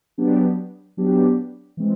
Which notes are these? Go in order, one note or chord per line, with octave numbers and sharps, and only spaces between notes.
F#3 B3 D4 G4
F#3 B3 D4 G4
E3 G#3 C4